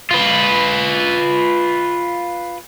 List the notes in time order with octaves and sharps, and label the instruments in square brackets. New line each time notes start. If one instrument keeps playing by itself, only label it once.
[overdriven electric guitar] F4 B4